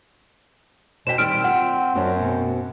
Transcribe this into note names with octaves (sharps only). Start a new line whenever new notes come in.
B2 C5 G5 B6 E7
D#3 G3 C4 G4 E6 F6 D7
F4 F#5
F#2 F#3 C4 D4
B2 C4